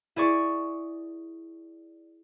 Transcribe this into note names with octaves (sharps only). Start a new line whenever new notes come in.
E4 G#4 D5 C#6